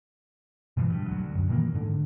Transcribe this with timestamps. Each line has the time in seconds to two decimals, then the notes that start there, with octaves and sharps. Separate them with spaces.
0.77 G2 B2 E3 F3
0.90 G2
1.08 D2 F#3
1.35 F#2
1.49 A#2 D#3 E3 A#3
1.74 G#2 D3